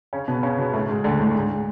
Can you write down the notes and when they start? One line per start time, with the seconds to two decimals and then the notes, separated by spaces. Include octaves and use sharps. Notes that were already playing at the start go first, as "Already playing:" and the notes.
0.13 C#3 C#4
0.28 B2 B3
0.43 C#3 C#4
0.58 B2 B3
0.73 A2 A3
0.89 G#2 G#3
1.04 D2 D3
1.20 A2
1.35 G#2